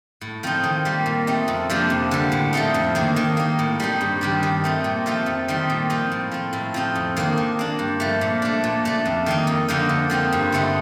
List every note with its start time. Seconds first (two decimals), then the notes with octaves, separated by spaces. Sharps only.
0.21 A2
0.43 F3 C4 D#4
0.64 D#3
0.85 G3 A#3
1.06 A#2
1.27 A3 C4 D#4
1.48 F2
1.70 C3 F3 A#3 D4
1.90 F2
2.11 D3 G3
2.32 A2
2.53 F3 A3 C4 D#4
2.74 F2
2.95 D#3 A#3 D4
3.16 D#3
3.37 A#3 D#4
3.59 A2
3.80 G3 C4 D#4
4.01 G2
4.21 D#3 G3 D4
4.43 D#3
4.64 A3 C4 D#4
4.84 A#2
5.06 F3 A3 C4 D#4
5.26 F2
5.48 D#3 G3 C4 D#4
5.70 A#2
5.90 F3 C4 D#4
6.12 A2
6.31 F3 C4
6.53 A2
6.74 F3 C4 D#4
6.95 F2
7.17 D#3 A#3 D4
7.37 D#3
7.59 A#3 D4
7.79 G2
8.00 F3 A3
8.21 A#2
8.42 A3 D4
8.64 A#2
8.85 A3 D4
9.06 F2
9.26 D#3 A#3 D#4
9.47 F2
9.68 D3 F3 A#3 D#4
9.89 D3
10.10 F3 C4 D#4
10.32 G2
10.52 D3 A3 C4 D#4